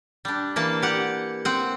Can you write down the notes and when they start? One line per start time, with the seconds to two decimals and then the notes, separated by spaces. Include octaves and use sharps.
0.25 G3 D4
0.56 E3 A#3 A5
0.82 G4 F#5
1.45 C4 F#5